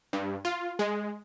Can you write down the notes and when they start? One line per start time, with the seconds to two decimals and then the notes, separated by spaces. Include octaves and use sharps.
0.13 G2
0.45 F4
0.79 G#3